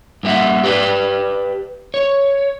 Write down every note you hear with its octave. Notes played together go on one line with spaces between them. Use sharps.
G2 A#3 G4 E5 F#5
G4 B4 D5 G5
C#5